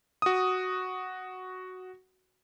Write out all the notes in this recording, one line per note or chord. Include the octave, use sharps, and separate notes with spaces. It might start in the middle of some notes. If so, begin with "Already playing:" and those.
F#4 D#6